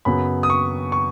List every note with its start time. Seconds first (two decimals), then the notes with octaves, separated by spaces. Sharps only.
0.05 F#2 C#3 F#3 B3 B5
0.43 D#6
0.50 C#6
0.92 C#6